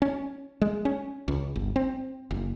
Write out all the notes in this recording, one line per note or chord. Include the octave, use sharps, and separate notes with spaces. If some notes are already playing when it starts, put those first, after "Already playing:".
C#4
G#3
C#4
C#2
G1
C4
F#1